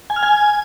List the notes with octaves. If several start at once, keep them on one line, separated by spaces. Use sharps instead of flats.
G#5
F6
G#5